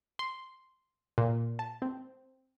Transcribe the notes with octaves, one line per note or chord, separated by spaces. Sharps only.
C6
A#2
A5
C4